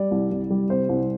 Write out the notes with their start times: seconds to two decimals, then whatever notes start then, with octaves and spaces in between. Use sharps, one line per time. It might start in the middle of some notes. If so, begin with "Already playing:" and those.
Already playing: G3 D5
0.11 C2
0.32 C2
0.50 G3
0.70 C3 C5
0.89 C2